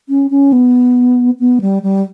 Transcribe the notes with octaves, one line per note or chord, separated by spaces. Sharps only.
C#4
C#4
B3
B3
G3
G3